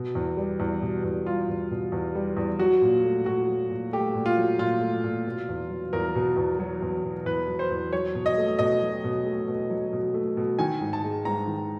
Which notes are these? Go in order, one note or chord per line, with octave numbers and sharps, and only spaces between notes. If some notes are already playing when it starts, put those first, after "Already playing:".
Already playing: B2
E2
G3
E2
B2
E2
G3 F4
E2
B2
E2
G3
E2
F#3 F#4
A#2
A3
A#2 F#4
F#3
A#2
A3 G4
A#2
F4
F#3
A#2 F4
A3
A#2
B2
E2
F#3
E2 A#4
B2
E2
F#3
E2
B2
E2 B4
F#3
C5
E2
F#3 C#5
B2
D#5
A3
B2 D#5
F#3
B2
A3
B2
F#3
B2
A3
B2
D#3 G#5
G#2
A5
G#3
G#2 A#5
D#3